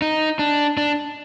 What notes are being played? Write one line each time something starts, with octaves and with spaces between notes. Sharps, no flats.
D#4
D4
D4